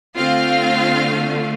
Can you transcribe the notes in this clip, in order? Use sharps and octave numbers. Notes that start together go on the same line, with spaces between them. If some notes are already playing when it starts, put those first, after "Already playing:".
D3 A3 C4 F4 F5